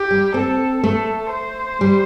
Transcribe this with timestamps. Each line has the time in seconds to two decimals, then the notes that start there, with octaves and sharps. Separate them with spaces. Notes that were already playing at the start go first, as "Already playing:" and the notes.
Already playing: G4
0.11 G3
0.34 C4 A4
0.83 A3 A4
1.32 C5
1.81 G3